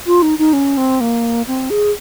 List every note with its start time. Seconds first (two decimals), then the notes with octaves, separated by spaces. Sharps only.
0.07 F4
0.22 D#4
0.39 D#4
0.53 C#4
0.77 C4
1.01 A#3
1.47 C4
1.70 G#4